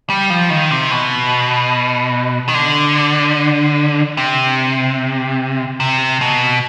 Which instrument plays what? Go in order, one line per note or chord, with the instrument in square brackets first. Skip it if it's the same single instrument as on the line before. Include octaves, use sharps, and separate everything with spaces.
[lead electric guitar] G3
F3
D#3
C3
B2
D#3
D3
C3
C3
B2